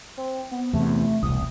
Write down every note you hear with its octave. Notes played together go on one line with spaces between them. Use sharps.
C4
B3
E2 C3 A3
E1 C2 D#6